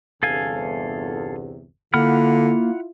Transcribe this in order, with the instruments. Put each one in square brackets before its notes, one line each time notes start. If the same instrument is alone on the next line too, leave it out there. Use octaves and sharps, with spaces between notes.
[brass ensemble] G1 E2 C3 [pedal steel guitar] A4 F5 G#5
[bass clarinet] D3 [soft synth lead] A#3 [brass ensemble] E4 F4 [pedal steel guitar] F#5 B5 F6